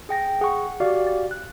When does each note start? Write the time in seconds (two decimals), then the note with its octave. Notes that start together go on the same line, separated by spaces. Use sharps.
0.09 G#4 G5 A#6
0.41 G#4 F#5 C#6
0.80 F#4 G4 D5 F5 A6
1.07 A6
1.31 F#6